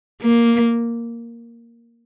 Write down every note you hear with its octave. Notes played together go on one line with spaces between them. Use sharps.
A#3